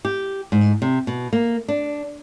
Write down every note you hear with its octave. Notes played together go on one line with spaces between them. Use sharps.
G4
G#2
C3
B2
A#3
D4